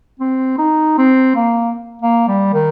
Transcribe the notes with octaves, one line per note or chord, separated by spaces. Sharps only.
C4
D#4
C4
A#3
A#3
G3
D#3